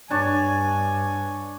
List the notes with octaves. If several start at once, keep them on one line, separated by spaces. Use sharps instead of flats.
G2 D4 C#5 G#5 A5